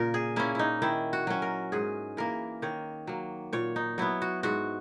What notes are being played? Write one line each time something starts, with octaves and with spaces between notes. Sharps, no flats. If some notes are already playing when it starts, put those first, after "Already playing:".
Already playing: A#2 C#3 A#4
G#4
A#3 C#4 E4
D#4 E4
D#3 E4
F#4
F#3 C#4
A#4
G#2 G#4
E3 A#3 A#4
D#3 C#5
F#3 A#3
A#2 C#5
D#4
F#3 B3 E4
F#4
G#2 F#4